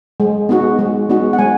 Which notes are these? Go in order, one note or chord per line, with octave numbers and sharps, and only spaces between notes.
G#3
B3 D#4 F#4
G#3
B3 D#4 F#4
F#5
G#3 G#5